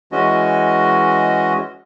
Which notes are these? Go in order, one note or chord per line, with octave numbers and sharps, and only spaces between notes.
E3 G#3 C#4 F#4 D#5